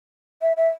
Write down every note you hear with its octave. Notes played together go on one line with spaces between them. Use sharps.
E5
E5